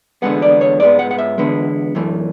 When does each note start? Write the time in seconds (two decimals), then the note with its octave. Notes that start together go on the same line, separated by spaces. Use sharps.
0.22 E2 D3 G#3 B3 F#5
0.42 D5
0.61 C#5
0.80 G#2 G#3 B3 D5
0.99 F#5
1.11 F#5
1.18 E5
1.38 E2 D3 G#3 B3
1.95 F#2 E3 A3